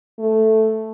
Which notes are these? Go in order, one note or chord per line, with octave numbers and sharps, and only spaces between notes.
A3